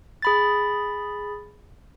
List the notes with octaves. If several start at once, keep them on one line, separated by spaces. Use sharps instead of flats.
G#4 B5 A6